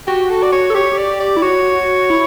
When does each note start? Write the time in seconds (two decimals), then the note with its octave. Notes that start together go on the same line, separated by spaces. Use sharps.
0.07 F#4 G4
0.30 A4
0.43 D5
0.52 C#5
0.70 A4
0.75 G4 C#5
0.98 D5
1.20 D5
1.37 E4
1.42 F#4 C#5
2.10 E4